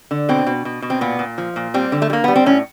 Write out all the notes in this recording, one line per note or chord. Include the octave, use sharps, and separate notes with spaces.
D3
B2 C4
B2
B2
B2
C4
A#2 B3
A#2
F3
A#2
G3 C4
D3
A3
G3
A#3
G3 B3
C4
A2 C#4